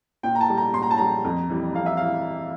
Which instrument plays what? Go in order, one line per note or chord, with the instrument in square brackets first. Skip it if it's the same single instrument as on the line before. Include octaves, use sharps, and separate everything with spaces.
[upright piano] A#2 G5
A#5
A5
G3
A#5
A#2 C6
A#5
A5
G3 A#5
F2
E3 G3
F2 F5
E5
E3 F5